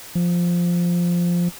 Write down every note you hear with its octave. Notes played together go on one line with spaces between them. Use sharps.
F3